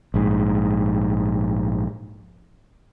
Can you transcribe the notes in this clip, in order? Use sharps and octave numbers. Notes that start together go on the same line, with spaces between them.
A#1 G#2